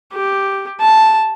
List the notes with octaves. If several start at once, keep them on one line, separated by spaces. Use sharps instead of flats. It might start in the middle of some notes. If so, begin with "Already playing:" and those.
G4
A5